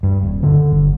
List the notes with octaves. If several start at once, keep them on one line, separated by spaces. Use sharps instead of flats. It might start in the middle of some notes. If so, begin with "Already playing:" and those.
G2
D#1
D3
G1